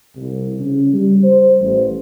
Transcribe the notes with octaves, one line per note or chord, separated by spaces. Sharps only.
C2
C#3
G3
C5
A1